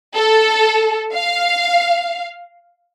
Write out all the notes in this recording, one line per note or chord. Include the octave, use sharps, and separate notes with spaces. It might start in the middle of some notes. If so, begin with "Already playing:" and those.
A4
F5